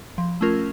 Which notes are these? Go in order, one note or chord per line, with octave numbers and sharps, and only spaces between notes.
F3
A3 C#4 F4 A#4